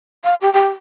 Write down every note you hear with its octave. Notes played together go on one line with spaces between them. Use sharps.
F5
G4
G4